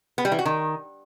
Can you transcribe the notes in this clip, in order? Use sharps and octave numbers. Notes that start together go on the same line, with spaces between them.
B3
G3
E3
F#4
D#3